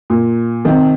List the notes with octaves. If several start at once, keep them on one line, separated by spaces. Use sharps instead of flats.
A#2
C3 D#3